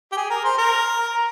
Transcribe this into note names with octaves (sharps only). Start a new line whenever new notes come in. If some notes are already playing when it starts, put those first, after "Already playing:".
G4
G#4
A#4
C5
A#4